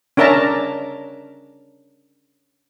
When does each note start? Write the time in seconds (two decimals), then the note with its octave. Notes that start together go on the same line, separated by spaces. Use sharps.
0.17 C#4 D4 A#4 E5 A5 A#5